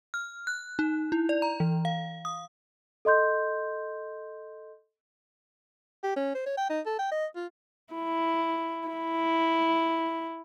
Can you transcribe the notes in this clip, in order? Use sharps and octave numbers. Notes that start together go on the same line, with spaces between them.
F6
F#6
D#4
E4
D5
A#5
E3
F5
D#6
A4 D#5 C6 G6
G4
C#4
C5
C#5
G5
D#4
A4
G5
D#5
F4
E4
E4